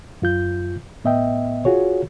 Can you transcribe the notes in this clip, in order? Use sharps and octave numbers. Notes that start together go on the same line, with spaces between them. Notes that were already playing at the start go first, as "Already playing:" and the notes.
F#2 F4 G6
A2 B3 D#5 E5 G5
F4 F#4 G#4 C#5